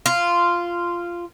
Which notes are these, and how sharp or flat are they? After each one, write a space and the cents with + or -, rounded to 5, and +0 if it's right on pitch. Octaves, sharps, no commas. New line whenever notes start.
F4 -10